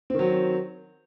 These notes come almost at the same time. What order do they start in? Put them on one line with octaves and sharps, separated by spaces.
C4 D#3 F#3